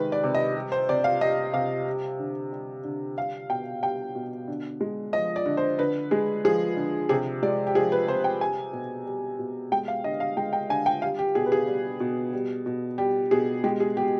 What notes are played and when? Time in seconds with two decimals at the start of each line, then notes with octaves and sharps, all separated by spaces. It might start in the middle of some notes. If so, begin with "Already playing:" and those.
Already playing: C3 D#3 G#3 B4
0.12 D5
0.24 C3
0.35 D#5
0.55 G3
0.72 C5
0.89 C3 D5
1.04 F5
1.21 G3 D#5
1.53 C3 F5
1.87 G3
2.19 D3
2.52 G3
2.84 D3
3.17 G3 F5
3.50 B2 G5
3.83 G3 G5
4.15 B2
4.48 D3
4.81 G#3
5.13 F3 D#5
5.36 D5
5.46 D3
5.57 C5
5.78 D3 B4
6.11 G#3 G#4
6.45 F3 G#4
6.77 D3
7.09 C3 G#4
7.42 G#3 D5
7.67 G4
7.75 F3 G#4
7.92 B4
8.07 C3 C5
8.24 G5
8.41 G3 G#5
8.73 B2
9.06 G3
9.39 B2
9.72 G#3 G5
9.88 F5
10.04 D3 D#5
10.20 F5
10.37 G#3 G5
10.53 G5
10.69 D3 G#5
10.86 G5
11.02 G3 F5
11.19 G4
11.35 B2 G#4
11.46 B4
11.52 G#4
11.67 G3
12.00 B2
12.33 G3
12.66 B2
12.98 G3 G4
13.31 B2 G#4
13.64 G#3 G4
13.80 G#4
13.97 B2 G4